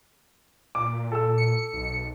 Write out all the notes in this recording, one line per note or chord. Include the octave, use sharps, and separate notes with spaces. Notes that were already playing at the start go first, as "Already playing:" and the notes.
A#2 D6
A4 E6
C#7
B1